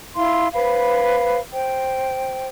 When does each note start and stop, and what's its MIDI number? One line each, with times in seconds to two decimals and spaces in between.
0.16 0.48 64
0.16 0.48 77
0.16 0.48 84
0.54 1.38 71
0.54 1.38 72
0.54 1.38 77
0.54 1.38 83
1.52 2.46 72
1.52 2.46 79